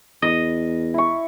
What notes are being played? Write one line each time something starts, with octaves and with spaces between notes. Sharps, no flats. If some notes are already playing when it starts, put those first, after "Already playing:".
E2 D#5
E4 C#6